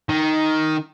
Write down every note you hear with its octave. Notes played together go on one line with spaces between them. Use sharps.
D#3